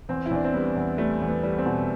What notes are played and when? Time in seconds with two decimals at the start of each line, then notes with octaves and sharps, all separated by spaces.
0.09 E2 C4
0.26 E4
0.31 E2 D4
0.44 C4
0.54 G3 B3
0.76 E2
0.98 G3 A3
1.21 E2
1.28 B3
1.43 G3
1.58 C4
1.66 B2